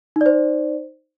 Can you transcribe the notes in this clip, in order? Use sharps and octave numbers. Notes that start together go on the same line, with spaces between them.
D#4 C5 D5